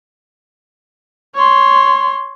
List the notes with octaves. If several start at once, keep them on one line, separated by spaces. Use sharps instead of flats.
C#5 C6